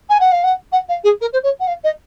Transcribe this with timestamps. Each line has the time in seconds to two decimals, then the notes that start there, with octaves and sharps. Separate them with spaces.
0.09 G#5
0.20 F#5
0.31 F5
0.43 F#5
0.72 F#5
0.88 F5
1.04 G#4
1.21 A#4
1.32 C5
1.43 C#5
1.60 F#5
1.67 F5
1.84 D#5